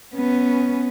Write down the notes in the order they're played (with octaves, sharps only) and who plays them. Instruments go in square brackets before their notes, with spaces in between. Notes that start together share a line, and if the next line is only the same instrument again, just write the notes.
[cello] B3 C#4